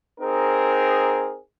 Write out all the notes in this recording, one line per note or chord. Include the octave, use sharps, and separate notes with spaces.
C4 D#4 G#4 A#4